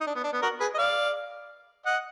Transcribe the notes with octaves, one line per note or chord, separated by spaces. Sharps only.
D#4
D4
B3
D4
B3
F#4 A#4
G#4 B4
D#5
D5 F5
D#5 F#5